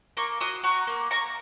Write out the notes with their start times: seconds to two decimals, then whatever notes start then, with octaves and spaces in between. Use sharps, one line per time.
0.17 A#3 A#5 C#6
0.40 F#4 C6 D#6
0.63 F#4 A#5 C#6
0.87 A#3
1.11 A#3 A#5 C#6